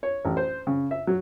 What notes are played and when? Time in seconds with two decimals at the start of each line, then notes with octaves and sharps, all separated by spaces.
0.03 C#5
0.25 A1
0.37 C5
0.67 C#3
0.91 E5
1.07 F#3